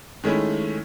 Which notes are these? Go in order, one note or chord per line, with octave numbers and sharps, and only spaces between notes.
D#3 G#3 A3 C#4 E4